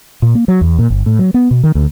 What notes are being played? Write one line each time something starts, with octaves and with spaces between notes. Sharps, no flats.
A#2
A#3
F#3
E2
A#2
G1
A2
F#3
B3
B2
D#3
D2